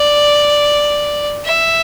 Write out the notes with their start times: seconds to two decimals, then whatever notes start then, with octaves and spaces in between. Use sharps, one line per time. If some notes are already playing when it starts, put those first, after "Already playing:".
Already playing: D5
1.45 E5